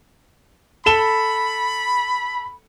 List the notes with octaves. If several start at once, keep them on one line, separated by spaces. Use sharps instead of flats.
A4 B5 E7 G7